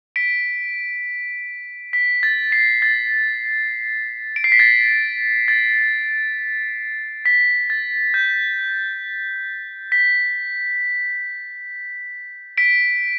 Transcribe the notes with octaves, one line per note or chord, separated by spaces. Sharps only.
B6 D7
B6
A6
C7
A6
D7
C7
B6
A6
A6
B6
A6
G6
B6
B6 D7